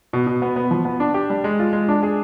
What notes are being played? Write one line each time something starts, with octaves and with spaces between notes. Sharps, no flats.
B2
B2
B3
B3
F3
B3
D4
G4
G3
G#3
F4
G#3
D4
G#4